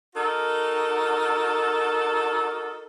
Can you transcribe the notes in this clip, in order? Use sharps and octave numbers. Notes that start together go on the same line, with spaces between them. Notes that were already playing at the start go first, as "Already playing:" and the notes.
D#4 F#4 A4 A#4